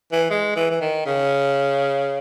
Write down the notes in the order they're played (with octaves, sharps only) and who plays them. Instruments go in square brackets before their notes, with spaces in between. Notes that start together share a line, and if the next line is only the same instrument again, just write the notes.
[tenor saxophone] E3
G#3
E3
E3
D#3
C#3